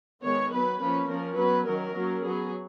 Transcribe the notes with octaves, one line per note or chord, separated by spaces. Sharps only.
D#3 G#3 B3 C#5
F#3 B3 B4
F3 A#3 C#4 B4
F3 A#3 C#4 A#4
F#3 B3 B4
D#3 F#3 C#4 A#4
F#3 A#3 C#4
F#3 B3 G#4